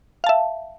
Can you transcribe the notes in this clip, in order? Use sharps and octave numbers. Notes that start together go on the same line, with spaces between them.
E5 F5 A5